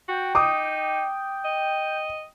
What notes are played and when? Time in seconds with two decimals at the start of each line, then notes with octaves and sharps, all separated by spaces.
0.08 F#4 G5
0.35 D#4 D6 D#6
1.45 D#5